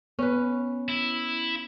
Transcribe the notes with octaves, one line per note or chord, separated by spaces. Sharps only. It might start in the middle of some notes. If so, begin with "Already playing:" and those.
B3 C#4 B4
E4